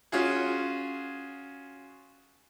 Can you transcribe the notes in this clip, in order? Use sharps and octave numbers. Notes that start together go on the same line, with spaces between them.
C#4 F4 F#4 G#4